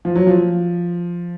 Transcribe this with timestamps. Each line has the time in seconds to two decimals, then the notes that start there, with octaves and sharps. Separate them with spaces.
0.05 F3
0.15 F#3
0.27 F3